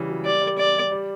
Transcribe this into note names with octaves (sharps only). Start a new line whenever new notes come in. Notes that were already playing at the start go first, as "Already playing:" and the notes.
Already playing: C#3 E3 G3
F#3
G3 D5
G3
D5
G3
G3